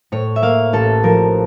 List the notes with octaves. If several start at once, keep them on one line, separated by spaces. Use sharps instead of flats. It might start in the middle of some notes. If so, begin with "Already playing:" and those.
A2 C#5
E5
A#3 F5
A1 A4
F3 A#4